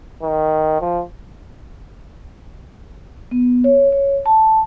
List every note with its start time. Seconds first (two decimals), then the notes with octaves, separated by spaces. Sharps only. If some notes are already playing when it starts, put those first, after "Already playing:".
0.22 D#3
0.80 F3
3.31 B3
3.64 C#5
3.92 C#5
4.26 A5